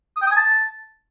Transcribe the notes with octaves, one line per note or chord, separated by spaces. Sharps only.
D#6
G5
D#6
G#5
A5